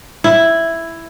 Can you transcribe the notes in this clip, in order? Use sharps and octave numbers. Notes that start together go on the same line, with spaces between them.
E4